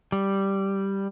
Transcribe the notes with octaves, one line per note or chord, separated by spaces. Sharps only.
G3